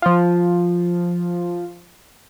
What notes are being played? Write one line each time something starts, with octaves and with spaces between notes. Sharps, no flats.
F3 F4